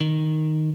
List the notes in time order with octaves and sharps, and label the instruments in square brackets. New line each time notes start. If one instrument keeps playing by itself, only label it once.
[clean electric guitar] D#3